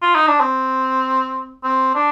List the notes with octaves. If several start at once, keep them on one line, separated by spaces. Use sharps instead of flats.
F4
D#4
D4
C4
C4
D4